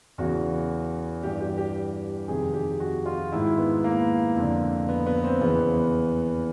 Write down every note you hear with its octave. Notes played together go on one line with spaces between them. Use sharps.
E2 C#3 E3 F#4
G2 E3 G4
G4
G4
F2 C3 D#3 G#4
G4
F#4
F4
G#2 D#3 E4
B3
A#3
F2 D3
B3
B3
C4
E2 C#3 E3 B3